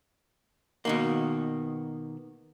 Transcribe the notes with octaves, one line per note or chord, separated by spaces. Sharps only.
B2 D#3 A#3